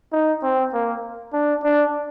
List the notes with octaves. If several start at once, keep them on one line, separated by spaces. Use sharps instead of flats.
D#4
C4
A#3
D4
D4